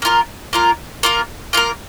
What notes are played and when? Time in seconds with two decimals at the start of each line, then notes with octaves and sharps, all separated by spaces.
0.02 A#3 F4 A#4
0.53 A#3 F4 A#4
1.03 A#3 F4 A#4
1.53 A#3 F4 A#4